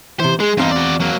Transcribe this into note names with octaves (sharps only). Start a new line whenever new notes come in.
C3 E3 C5
G#3 G#4
E2 G2 C4 D#4 F5
F#4 D5
F#3 A#3